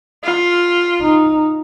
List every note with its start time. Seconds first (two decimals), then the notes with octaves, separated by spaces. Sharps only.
0.25 F4
1.01 D#4